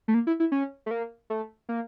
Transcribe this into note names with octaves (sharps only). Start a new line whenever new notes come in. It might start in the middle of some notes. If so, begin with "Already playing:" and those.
A3
A#3
E4
E4
C#4
A3
A#3
A3
A#3